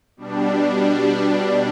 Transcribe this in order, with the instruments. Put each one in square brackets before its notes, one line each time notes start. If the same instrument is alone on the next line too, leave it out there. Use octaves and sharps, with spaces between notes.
[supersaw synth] B2 G3 D4